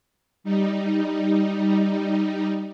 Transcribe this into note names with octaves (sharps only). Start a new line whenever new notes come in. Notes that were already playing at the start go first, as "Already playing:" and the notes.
G3 D#4